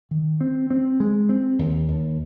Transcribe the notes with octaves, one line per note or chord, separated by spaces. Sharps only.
D#3
C4
C4
G#3
C4
D#2
D#2